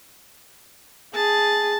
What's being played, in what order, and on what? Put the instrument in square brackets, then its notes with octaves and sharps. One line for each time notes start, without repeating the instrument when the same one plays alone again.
[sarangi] G#4 [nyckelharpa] A5